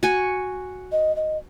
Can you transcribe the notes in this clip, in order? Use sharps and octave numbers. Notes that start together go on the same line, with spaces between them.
F#4 G#5 C#6
D#5
D#5